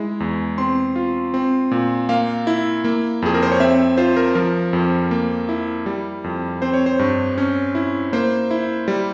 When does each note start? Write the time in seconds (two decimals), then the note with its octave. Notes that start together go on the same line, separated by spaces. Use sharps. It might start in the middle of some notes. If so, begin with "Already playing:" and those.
Already playing: G#3 E4
0.20 E2
0.58 C4 C6
0.96 F4
1.34 C4
1.71 A#2
2.09 A#3 F5
2.47 E4
2.84 A#3
3.22 F2 G#4
3.34 A#4
3.43 C5
3.52 C#5
3.60 C4 E5
3.97 F4 C5
4.17 A#4
4.35 F3 A#4
4.73 F2
5.11 A#3
5.49 E4
5.86 G3
6.24 F2
6.62 C4 C5
6.74 C#5
6.86 C5
6.99 G2
7.38 C#4
7.75 E4
8.13 A#3 C5
8.51 E4
8.88 G3